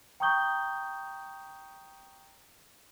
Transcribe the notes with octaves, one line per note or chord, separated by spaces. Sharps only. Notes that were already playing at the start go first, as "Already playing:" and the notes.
G5 A#5 C#6 D#6 G6 G7